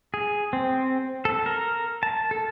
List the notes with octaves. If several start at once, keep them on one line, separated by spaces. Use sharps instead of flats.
G#4
C4
A4
A#4
A5
A4